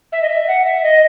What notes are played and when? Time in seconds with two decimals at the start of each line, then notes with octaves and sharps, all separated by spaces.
0.12 E5
0.22 D#5
0.28 E5
0.47 F#5
0.65 E5
0.83 D#5